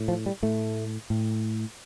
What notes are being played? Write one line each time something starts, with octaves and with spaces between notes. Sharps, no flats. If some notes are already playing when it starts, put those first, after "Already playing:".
Already playing: A2
F3
G3
A2 A3
A2